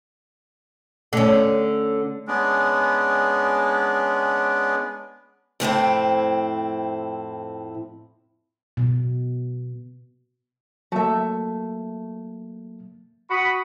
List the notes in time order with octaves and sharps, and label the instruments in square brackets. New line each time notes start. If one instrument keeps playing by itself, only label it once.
[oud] D3 C#4 [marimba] A3
[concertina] G#3 B3 C#4 D4
[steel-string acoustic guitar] F2 A2 C4 E4
[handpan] B2
[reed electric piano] F#3 A#3 [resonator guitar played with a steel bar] A3 E5
[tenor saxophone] F#4 [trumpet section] B5 D#6